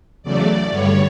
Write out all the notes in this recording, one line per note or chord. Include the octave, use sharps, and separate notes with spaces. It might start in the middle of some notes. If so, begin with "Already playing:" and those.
E2 C#3 F#3 A3 D5
G2 D3 G3 C#5